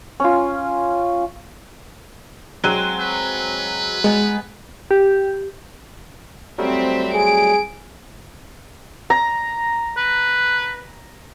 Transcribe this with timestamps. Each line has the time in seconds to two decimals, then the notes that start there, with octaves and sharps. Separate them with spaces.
0.20 C#4 F4
2.64 F#3 G#3 C4 F#4 F#6 D#7
3.00 B4
4.04 G#3 B3 D#4 G#4
4.91 G4
6.58 F#3 G3 A3 C4 E5
7.15 G#4 D7
9.10 A#5
9.97 B4